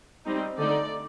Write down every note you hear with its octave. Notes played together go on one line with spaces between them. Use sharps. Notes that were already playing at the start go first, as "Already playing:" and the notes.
G3 C4 D#4
D3 A3 D#4 D5